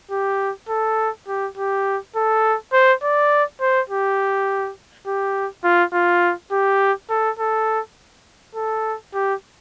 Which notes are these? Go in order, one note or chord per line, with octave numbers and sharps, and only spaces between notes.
G4
A4
G4
G4
A4
C5
D5
C5
G4
G4
F4
F4
G4
A4
A4
A4
G4